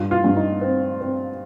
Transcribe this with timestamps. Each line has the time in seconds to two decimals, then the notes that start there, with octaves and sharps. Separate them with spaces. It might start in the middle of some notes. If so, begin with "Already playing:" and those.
Already playing: G2 F4
0.11 F4
0.24 G2
0.36 D#4
0.61 C4
1.00 C4